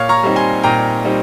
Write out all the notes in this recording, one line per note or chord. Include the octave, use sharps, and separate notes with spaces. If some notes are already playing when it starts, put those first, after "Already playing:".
Already playing: A#2 C#5 F5
A#5 C#6
G3 C4 D#4
G#5 C6
A#2 G5 A#5
G3 C4 D#4